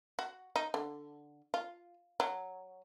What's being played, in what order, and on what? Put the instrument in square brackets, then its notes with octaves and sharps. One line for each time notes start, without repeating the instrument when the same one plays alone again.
[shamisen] F#4
D#4
D3
F4
F#3